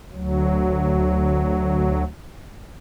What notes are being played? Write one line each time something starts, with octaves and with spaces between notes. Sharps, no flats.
D2 F#3